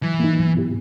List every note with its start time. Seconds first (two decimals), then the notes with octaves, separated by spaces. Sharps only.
0.02 E3 F#3
0.20 A#3 D#4
0.37 F#3
0.54 B3 E4 G4